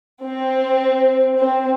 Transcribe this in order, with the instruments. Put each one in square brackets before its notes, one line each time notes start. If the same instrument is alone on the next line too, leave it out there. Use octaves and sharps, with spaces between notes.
[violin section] C4
C4